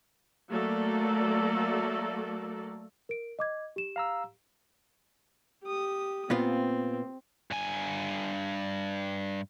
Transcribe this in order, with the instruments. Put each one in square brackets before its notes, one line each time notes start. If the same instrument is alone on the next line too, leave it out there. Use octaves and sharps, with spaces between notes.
[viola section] F#3 A3 A#3 A4 D5
[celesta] A#4 D7
D#5 D6 G#6
G4 E7
[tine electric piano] F5 A#5 E6
[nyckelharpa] G4 D#6
[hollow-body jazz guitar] A#2 B3 F4 [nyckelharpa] C4
[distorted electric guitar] G2 G#5